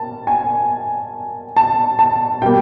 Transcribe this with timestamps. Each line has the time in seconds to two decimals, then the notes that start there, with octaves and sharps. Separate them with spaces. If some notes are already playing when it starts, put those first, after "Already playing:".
Already playing: A#3 A5
0.27 G#5
1.56 A5
1.99 A5
2.42 B2 G3 A#3 G5